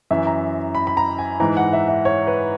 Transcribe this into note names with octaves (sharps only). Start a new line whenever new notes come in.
F#2 E3 E5
A#5
B5
B5
A#5
G#5
G#2 E3 A#5
F#5
E5
E5
C#5
B4